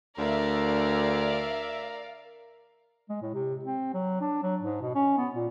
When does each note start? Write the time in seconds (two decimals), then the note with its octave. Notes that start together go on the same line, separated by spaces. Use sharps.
0.18 D2 A#4 D5 E5 F5
3.09 G#3
3.22 A2
3.34 C3
3.65 C4
3.94 F#3
4.21 D4
4.43 F#3
4.62 G#2
4.82 B2
4.95 C#4
5.17 B3
5.35 A#2